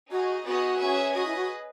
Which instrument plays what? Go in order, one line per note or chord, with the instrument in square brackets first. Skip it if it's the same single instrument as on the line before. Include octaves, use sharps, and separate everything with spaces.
[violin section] D#4 G#4 D#5 [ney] F#4
[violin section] B3 D#4 G#4 B4 D#5 [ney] F#4
[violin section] C#4 G#4 B4 E5 G#5
[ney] F#4 [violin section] G#4 B4 D#5
[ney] E4
F#4